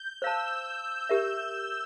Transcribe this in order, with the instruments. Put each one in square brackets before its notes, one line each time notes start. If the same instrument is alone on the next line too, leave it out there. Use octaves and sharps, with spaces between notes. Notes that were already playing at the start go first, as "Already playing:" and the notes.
Already playing: [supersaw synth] G6
[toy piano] C5 F5 A5 [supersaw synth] E6
[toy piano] G4 A#4 E5